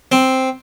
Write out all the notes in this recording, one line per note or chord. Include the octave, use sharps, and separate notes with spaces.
C4